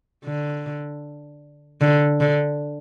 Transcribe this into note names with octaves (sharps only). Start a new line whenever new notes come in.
D3
D3
D3